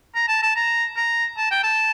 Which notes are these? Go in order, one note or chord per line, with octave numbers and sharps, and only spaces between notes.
A#5
A5
A5
A#5
A#5
A5
G5
A5